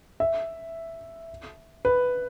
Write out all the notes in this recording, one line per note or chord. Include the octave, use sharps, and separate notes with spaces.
E5
B4